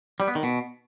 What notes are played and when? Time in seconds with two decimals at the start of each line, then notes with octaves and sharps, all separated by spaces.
0.20 G3
0.27 B3
0.35 D#3
0.43 B2